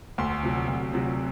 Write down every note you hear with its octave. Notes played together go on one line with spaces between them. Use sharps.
D2 C6
C3 F#3
D2
C3 F#3